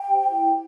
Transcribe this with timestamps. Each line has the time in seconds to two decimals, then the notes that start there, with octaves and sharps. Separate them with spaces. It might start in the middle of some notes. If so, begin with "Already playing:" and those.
Already playing: G5
0.09 G4 C5
0.31 E4 G5